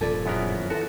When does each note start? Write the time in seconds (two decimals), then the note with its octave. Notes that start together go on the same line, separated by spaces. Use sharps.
0.01 D#1 G2 F3 A4 D5
0.26 F#2 B3 E4 G#4 A#4
0.70 E3 F#4 A4 E5